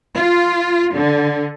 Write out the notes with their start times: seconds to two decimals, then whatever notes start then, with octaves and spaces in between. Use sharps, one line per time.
0.14 F4
0.94 D3